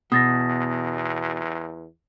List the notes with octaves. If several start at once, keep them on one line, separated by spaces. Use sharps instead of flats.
E2 B2 D#6 A6 A#6